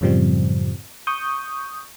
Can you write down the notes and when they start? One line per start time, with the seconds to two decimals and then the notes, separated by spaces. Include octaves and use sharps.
0.01 F#2 A2 C#3 F3 G3 C4
1.07 C#6 D#6 G6